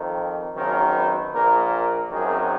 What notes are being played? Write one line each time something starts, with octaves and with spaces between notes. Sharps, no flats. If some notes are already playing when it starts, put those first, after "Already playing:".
Already playing: F2 D#3
G#1 F#2 D#3 A#4
B4
A#1 A#2 A#4
A#4
G#1 F#2 D#3 G#4